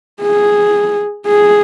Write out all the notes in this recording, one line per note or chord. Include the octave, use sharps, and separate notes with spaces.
G#4
G#4